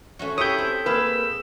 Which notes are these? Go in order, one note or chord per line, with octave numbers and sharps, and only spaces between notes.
A3 C#4 F#4
E4 G4 C#5 D#6 G6
C4
A#3 G#4 B4 E6